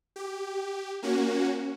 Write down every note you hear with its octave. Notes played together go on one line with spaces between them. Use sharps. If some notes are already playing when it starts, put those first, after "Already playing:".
G4
A#3 C#4 F#4